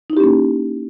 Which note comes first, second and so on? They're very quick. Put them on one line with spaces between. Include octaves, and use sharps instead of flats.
D#4 E4 G4 C#4 A#3